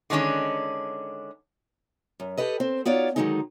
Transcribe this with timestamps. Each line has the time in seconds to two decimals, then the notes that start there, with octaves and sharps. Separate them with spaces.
0.10 D3 D#3 G#3 C#4 D4
2.20 F#2
2.38 G4 A4 B4 D#5
2.60 C4 C5
2.85 B3 D#4 F4 F#4 C#5 D5
3.16 D3 D#3 F#3 G#3 C4 D#4